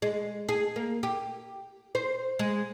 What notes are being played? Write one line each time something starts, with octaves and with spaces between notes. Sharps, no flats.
G#3
G#4
A#3
G4
C5
G#3